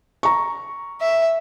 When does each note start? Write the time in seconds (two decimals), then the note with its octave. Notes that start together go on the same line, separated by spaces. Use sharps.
0.23 A#5 C#6
1.01 E5